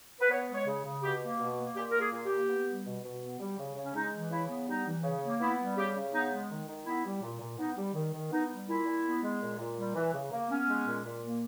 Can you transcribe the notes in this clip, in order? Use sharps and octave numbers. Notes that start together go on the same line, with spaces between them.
B4
B3 C#5
G#3
C#5
C#3
C#3
B2 G4
A#3
B2
A#3
A#2 G4
A#3 A#4
G#4
A#2
G4
A#3
B3
G3
B2
B2
B3
G3
C#3
C#3
C#4
G#3 D#4
E3
C#3 E4
B3
G3 D#4
E3
C#3
A#3
B3 E4
G3
C#3 G4
C#3
B3 D#4
G#3
D#3
D#3
B3 E4
G3
A#2
A#2
B3 D#4
G3
D#3
D#3
B3 D#4
G3
A#2 E4
A#2
B3
G#3
A#2
A#2
G3
E3
C#3
A#3
B3 C#4
G#3
A#2
A#2
A#3